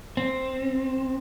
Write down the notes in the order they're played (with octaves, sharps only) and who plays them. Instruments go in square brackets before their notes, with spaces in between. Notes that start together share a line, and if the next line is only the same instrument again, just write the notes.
[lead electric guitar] C4